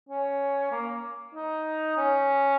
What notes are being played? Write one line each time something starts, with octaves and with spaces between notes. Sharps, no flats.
C#4
A#3
D#4
C#4